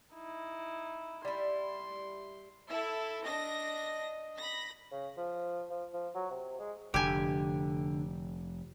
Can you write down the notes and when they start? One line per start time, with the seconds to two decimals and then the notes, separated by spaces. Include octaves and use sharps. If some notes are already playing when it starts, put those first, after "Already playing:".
0.14 D#4 E4
1.25 G3 E4 C6
2.69 E4 A4 E5
3.24 D4 D#5 A#6
4.36 B5 A#6
4.91 C#3
5.17 F3
5.70 F3
5.93 F3
6.15 F#3
6.30 C3
6.59 G#3
6.94 F1 D3 G4 G#5